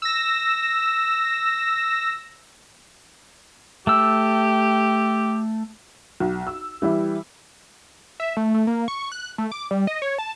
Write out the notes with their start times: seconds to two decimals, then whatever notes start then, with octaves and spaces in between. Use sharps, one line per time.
0.02 E6 A#6
3.87 A3 G4 E6
6.20 B1
6.47 E6
6.82 E3 G3 E4
8.20 E5
8.37 A3
8.54 A3
8.67 A#3
8.88 C#6
9.12 F#6
9.38 A3
9.52 D6
9.71 G3
9.87 D#5
10.02 C#5
10.19 A5